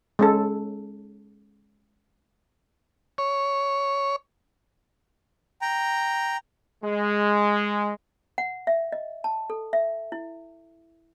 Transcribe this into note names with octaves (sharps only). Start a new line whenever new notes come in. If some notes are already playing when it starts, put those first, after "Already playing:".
G#3 C#4 A4
C#5
G5 A#5
G#3
F#5
E5
D#5
A5
A4
E5
E4